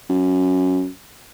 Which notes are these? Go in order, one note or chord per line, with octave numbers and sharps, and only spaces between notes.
F#2